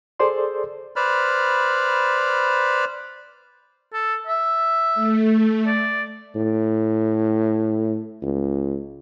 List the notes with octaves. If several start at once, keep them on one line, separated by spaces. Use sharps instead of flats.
G#4 A4 C5 D5 C6
B4 C5 D5 B5 F6
A4
E5
A3
D5
A2
C#2